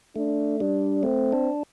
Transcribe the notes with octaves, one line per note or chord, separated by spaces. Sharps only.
A3 D4
G3 D4
A3 C4
D4